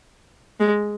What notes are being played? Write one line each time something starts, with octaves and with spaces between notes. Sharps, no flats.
G#3